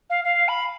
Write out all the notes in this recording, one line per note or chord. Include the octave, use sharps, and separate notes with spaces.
F5
F5
B5